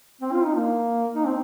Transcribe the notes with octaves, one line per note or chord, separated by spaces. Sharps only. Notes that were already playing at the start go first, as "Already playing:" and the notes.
C4
F4
D#4
A#3
D#4
C4